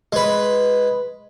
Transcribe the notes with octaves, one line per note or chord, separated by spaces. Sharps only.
G#3 B4